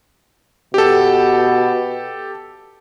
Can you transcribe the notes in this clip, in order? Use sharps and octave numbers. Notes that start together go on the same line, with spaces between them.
B2 G4 A4